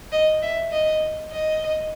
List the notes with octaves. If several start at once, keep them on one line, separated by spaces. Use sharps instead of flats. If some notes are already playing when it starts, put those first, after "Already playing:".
D#5
E5
D#5
D#5